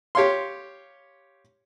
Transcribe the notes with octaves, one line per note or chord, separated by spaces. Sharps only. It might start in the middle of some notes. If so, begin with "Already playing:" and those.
G4 C#5 F5 C6